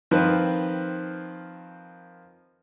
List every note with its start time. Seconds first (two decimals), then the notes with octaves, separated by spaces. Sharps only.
0.11 D#3 F3 C4 B4